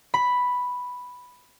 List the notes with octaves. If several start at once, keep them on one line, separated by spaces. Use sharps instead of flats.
B5